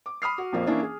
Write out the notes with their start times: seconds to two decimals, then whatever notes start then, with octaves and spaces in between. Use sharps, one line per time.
0.06 D6
0.22 B5 D#6 F6 C7
0.38 F#4
0.52 A#1 F2 F3 A#3
0.66 E3 A#3 C#4 D4 E4
0.83 G#4